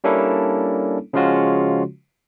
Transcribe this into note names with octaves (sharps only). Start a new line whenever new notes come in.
G3 A#3 C#4 D4 E4 A4
C#3 F3 G#3 C#4 F4 F#4